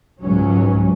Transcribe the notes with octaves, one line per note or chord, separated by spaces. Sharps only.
C#2 G#2 F#3 C#4